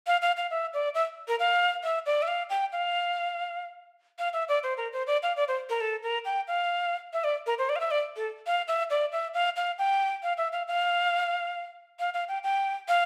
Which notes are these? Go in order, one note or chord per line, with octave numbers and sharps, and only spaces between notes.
F5
F5
F5
E5
D5
E5
A#4
F5
E5
D5
E5
F5
G5
F5
F5
E5
D5
C5
A#4
C5
D5
F5
D5
C5
A#4
A4
A#4
G5
F5
E5
D5
A#4
C5
D5
F5
E5
D5
A4
F5
E5
D5
E5
F5
F5
G5
F5
E5
F5
F5
F5
F5
G5
G5
F5